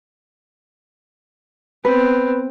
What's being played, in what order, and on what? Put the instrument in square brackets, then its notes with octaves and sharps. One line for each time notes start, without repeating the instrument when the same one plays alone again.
[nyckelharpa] B3 C4 [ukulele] B4